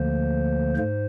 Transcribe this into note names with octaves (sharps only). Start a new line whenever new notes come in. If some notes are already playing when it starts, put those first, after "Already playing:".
Already playing: D2 D3 F3 A#3 C5
G#2 C5